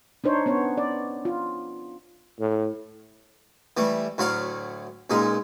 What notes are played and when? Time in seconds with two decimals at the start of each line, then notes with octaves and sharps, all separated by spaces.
0.24 D4 D#4 C5 C#5
0.46 B3 C#4 C#5
0.78 D5
1.25 F4
2.40 A2
3.77 E3 G3 A3
4.18 D2 A2 F#3 F5 F#5
5.10 C#2 A#2 G#3 D#4